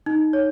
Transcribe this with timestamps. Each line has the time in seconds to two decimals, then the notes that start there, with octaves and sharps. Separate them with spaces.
0.06 D#4
0.33 C#5